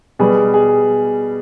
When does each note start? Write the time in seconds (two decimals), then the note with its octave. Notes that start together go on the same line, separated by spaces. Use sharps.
0.19 B2 G3 G#4
0.54 G#4